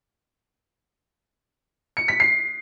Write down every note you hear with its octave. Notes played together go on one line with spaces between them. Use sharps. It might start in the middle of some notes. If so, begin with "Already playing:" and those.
C#7
B6
C7